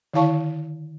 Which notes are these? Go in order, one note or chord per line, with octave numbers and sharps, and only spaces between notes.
D3 D#3 E4 F5 A5 C#6